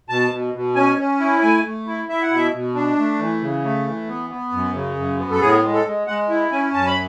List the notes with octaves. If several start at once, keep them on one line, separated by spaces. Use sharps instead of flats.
B2 A5
B2
B2
C#4 G#5
C#4
E4
A3 G#5
A3
E4
E4 E5
F#5
B2 E5
B2
D4
A3
E3
C#3
A3
E3
B3
B3
F#2
C#3
F#2
B3
A4
A2 G#4
G#3
A4
G#3
G#3 F#5
E4
C#4 G#5
F#2 A5
B5